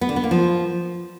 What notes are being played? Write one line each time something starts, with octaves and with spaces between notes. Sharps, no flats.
B3
D3
B3
A#3
F3